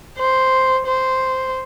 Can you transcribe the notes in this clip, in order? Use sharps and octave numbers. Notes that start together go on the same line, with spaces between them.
C5
C5